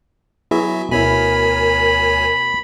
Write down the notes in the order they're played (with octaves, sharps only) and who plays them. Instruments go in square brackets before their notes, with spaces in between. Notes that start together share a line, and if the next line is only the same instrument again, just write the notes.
[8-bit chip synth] F#3 F#4 E5 [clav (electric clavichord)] B3 E4 G#4
[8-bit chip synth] D2 C#5 G#5 [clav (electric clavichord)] B2 E4 [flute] A#4 [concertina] B5